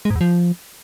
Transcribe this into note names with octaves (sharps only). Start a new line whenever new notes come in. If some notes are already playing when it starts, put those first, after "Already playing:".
G#3
G#2
E2
F3